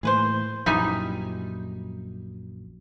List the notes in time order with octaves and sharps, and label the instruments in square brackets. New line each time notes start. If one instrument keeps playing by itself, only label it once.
[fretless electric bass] A2 E3 A#3 [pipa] G#4 B4 C5
[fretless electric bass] A#1 F#2 [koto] G3 D#4 G#5 [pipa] E4